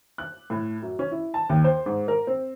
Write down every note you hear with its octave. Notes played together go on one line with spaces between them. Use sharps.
F#6
A2
F#2
C#4
E4
A5
D#2
C5
G#2
A#4
C4